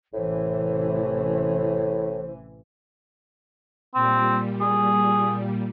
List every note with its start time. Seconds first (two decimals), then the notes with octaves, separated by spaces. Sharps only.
0.14 A1 A2 C3 E3 C5
3.95 A#2 G3 C4
4.61 G#4